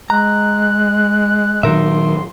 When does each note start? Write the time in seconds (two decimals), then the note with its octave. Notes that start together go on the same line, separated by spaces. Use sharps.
0.10 G#3 A#5 F#6
1.63 A#2 D#3 F#3 D#4 A#4 E5 C6